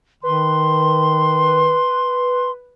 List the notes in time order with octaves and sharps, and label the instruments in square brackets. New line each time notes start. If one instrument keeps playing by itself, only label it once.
[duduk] D#3 [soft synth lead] B4 [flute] C6